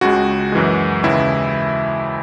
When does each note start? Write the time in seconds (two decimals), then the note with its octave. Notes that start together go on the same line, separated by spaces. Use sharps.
0.01 C#2 C#3 G#3 F#4
0.52 F#2 E3 G#3
1.03 D#2 C#3 E3 G#3 E4